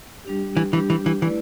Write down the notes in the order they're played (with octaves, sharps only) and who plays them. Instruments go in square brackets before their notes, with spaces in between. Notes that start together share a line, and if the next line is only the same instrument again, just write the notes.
[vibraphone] G3 D4 G4
[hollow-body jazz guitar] E3
[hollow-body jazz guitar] E3 [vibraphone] G3 D4 G4
[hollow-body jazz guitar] E3
E3
[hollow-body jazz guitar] E3 [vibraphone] A3 E4 B4 D5